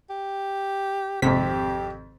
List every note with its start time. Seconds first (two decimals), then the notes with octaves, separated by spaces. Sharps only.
0.10 G4
1.22 G#1 F2 C3 C4 G4 B6